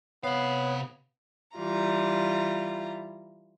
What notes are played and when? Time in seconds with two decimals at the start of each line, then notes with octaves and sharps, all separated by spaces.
0.24 C3 B3 C#5 F5
1.57 E3 G3 F4 A#5